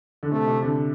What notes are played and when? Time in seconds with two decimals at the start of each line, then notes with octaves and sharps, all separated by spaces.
0.23 D3
0.31 C3 A3
0.48 C3
0.63 D3